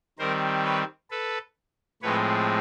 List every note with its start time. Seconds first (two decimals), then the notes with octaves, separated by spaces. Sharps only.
0.19 D#3 G3 C4 A#4 C5
0.64 B4 C#5
1.10 A4 B4
2.02 A2 F3 G#3 C4 B4 C#5